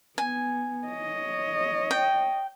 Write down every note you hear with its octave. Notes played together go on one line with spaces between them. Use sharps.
B3 G#5
C#5 D#5
G5